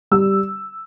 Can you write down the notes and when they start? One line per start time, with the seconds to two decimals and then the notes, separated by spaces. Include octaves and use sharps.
0.11 G3 E6